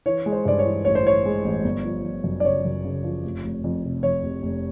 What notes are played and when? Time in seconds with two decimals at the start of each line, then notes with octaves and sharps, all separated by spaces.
0.06 E3 C#5
0.26 G#3
0.32 C5
0.45 G2 D5
0.59 C#5
0.65 E3
0.85 A1 C#5
0.95 C5
1.05 E3 C#5
1.26 G#3
1.45 A1
1.64 G1
1.85 F3
2.04 F3
2.24 F#2
2.40 D5
2.44 C#3 C#5
2.65 F#2
2.85 C#3
3.04 F3
3.24 F1
3.44 F1
3.64 F2
3.84 C3
4.03 F2 C#5
4.24 F1
4.43 F1